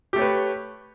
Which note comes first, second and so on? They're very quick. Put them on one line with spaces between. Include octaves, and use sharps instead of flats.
G4 A3 C#5 B4